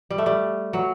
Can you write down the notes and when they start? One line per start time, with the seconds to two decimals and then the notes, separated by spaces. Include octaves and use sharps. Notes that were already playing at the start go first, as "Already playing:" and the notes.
0.11 G3
0.18 A3
0.26 G3
0.73 F#3